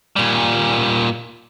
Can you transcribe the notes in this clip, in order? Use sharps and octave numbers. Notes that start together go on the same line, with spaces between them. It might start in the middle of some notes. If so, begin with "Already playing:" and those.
A#2 G3